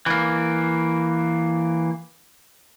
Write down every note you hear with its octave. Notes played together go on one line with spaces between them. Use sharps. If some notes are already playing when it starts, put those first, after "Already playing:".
E3 A#3